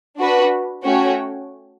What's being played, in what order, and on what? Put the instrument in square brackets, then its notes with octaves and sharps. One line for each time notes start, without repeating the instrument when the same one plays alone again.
[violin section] D4 F#4 B4
A3 C#4 F#4 C#5 G5